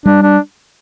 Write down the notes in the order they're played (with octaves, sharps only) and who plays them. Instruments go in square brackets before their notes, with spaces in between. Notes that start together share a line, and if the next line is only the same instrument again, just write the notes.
[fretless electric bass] G3 [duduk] D4
[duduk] D4